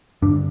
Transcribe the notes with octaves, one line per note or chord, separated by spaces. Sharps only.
G2 D3 D4